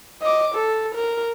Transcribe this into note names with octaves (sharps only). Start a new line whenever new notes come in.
D#5 D6
A4
A#4